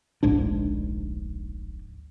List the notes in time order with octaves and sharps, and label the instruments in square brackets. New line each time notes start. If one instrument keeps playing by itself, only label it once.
[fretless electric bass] D1 A#1 G#2 D4